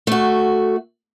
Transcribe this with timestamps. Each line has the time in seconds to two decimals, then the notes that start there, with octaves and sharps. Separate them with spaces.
0.07 A3 F#4